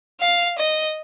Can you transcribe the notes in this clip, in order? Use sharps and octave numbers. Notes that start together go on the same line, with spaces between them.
F5
D#5